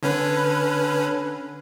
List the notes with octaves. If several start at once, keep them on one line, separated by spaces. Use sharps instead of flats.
D3 C#4 B4